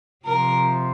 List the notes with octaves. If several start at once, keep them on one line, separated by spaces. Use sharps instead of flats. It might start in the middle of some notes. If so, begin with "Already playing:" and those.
C3 F3 A#4